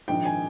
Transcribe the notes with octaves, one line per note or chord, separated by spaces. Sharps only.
A#1 G#2 D#3 G5
G#5